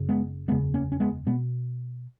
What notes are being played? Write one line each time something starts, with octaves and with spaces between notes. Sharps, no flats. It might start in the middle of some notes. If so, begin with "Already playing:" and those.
Already playing: F#1 F#2 C#3
G#3 B3
F#1 E2 C#3 G#3 B3
A#3 C#4
C#4
G#3 B3
B2 G#3 B3